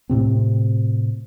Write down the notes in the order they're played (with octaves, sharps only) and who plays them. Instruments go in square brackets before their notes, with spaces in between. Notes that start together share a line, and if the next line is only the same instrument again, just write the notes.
[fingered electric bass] A2 C3 C4